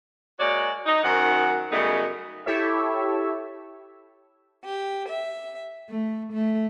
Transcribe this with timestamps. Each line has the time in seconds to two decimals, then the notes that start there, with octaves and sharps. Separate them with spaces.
0.39 G#3 A#3 F#4 C#5 D5
0.86 D#4
1.03 F#2 D#3 C5 F#5
1.71 F#2 C#3 G3 A3 B3 D#4
2.46 E4 G4 A4 C#5 E5
4.63 G4
5.08 E5
5.88 A3
6.32 A3